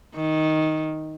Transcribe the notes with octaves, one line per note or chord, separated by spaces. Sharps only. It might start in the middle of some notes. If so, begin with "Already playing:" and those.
D#3